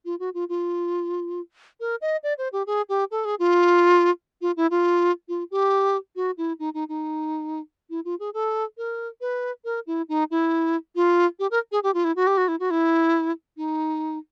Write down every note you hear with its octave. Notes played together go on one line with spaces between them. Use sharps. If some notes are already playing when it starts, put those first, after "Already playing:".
F4
F#4
F4
F4
A#4
D#5
D5
C5
G4
G#4
G4
A4
G#4
F4
F4
E4
F4
F4
G4
F#4
E4
D#4
D#4
D#4
E4
F4
G#4
A4
A#4
B4
A#4
E4
D#4
E4
F4
G4
A#4
G#4
G4
F4
E4
F#4
G4
F#4
E4
F#4
E4
D#4